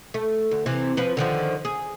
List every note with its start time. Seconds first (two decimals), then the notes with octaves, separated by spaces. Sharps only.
0.14 A3
0.51 D2
0.66 C3 E3
0.97 F3 B4
1.17 D3 D#3 F3
1.65 G#4